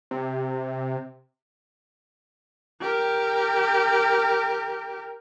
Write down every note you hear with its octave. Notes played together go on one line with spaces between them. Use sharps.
C3
G4 A#4